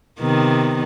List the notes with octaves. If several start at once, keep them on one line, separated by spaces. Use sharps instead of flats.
C3 D#3 B3